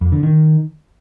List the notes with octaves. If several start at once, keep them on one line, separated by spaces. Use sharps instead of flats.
F2
D3
D#3